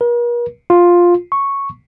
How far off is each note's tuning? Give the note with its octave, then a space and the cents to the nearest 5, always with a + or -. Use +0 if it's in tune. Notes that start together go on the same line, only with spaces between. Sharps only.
A#4 +45
F4 +5
C#6 -5